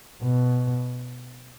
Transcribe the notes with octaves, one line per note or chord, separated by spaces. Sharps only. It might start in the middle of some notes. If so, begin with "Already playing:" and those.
B2